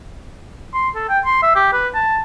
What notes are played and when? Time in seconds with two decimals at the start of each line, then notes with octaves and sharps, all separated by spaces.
0.74 C6
0.95 A4
1.09 G5
1.25 C6
1.42 E5
1.55 G4
1.73 B4
1.94 A5